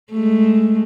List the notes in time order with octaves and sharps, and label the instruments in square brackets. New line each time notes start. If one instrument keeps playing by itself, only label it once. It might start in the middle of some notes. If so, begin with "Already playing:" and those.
[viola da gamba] G#3 A3